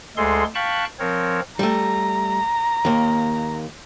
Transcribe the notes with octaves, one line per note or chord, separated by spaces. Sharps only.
D2 G#3 G#4 A4 C6
F5 G5 A5 B5 C#6 F#6
F3 C4 A#4 C#5
G3 A3 A#5
D#2 A#3